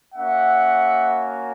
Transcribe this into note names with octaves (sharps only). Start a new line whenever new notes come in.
A#3 C#4 F#4 E5 F#5